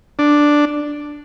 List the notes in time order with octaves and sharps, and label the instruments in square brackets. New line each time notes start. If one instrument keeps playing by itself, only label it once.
[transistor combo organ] D4